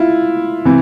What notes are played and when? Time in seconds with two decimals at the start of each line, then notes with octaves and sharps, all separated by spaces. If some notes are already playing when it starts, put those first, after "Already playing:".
Already playing: E4 F4
0.65 C3 E3